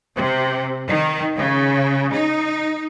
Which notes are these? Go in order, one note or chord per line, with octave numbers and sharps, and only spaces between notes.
C3
D#3
C#3
D#4